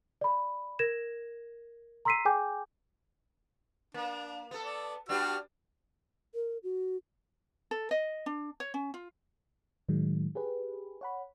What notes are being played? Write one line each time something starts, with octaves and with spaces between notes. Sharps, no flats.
D5 B5
A#4 G#6 A#6 E7
A#5 C6 E6 B6 C7 D#7
G#4 G5 G#5 D6 G6
A#3 D4
B3 A4
D5
G3 B3 D4 F#4 G4 F6
A#4
F#4
A4
D#5
D4
C#5
C#4
F4
A2 D#3 F#3 G#3
G4 G#4 B4
C#5 F#5 B5